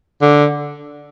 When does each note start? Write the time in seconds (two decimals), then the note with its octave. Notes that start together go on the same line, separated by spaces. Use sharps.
0.22 D3